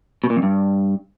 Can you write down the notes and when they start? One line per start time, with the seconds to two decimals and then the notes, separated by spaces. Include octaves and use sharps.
0.24 B2
0.30 A#2
0.37 F2
0.43 G2